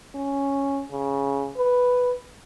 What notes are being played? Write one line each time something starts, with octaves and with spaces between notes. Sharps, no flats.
C#4
C#3
B4